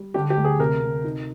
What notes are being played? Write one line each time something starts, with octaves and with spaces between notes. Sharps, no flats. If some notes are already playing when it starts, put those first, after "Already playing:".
Already playing: G3
D3 G4
G4
D2
G#4
C3 A#4
C3
D#4